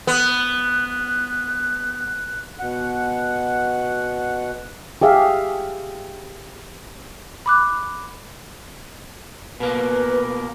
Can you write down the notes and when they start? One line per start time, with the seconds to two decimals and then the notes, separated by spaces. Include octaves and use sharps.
0.07 B3 F#6
2.59 B2 F#5
5.02 G4 G#4 E5 F5
7.46 B5 D6 F#6
9.60 B2 A#3 B4